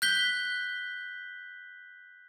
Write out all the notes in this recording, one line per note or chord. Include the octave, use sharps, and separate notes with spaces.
F#6 G6 B6 G7